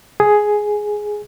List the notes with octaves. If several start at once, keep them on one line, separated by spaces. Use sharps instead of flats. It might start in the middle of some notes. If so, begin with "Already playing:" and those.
G#4